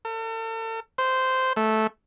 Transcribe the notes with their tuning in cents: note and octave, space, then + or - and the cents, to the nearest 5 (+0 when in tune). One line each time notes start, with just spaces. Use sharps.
A4 +40
C5 -10
A3 -10